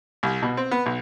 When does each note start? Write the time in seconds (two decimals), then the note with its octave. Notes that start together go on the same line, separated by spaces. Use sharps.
0.23 C2
0.43 B2
0.57 C4
0.71 B3
0.86 B1